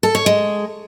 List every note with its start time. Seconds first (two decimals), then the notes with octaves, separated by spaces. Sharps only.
0.03 A4
0.15 C#5
0.26 G#3